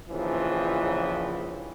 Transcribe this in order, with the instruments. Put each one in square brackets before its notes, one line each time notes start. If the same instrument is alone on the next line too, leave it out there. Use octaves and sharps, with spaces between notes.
[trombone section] A#1 D#2 C#3 E3 F3